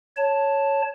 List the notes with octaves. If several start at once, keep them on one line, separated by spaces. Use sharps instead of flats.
C#5 A5